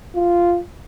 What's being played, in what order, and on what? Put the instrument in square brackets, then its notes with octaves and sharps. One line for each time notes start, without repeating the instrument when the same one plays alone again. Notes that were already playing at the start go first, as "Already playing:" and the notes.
[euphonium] F4